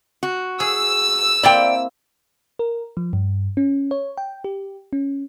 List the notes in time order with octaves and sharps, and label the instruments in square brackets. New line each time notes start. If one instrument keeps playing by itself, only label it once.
[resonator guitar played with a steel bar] F#4
[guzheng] G#4 [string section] E6
[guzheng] A#3 C4 E4 [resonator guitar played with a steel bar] D5 G5
[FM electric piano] A#4
F3
G2
C#4
C#5
G5
G4
C#4